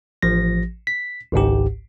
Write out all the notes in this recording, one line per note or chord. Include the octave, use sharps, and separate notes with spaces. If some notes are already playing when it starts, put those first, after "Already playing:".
A1 F3 A#6
B6
G#1 C#2 G#2 G4